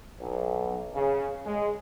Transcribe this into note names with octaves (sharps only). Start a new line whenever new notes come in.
B1
C#3
G#3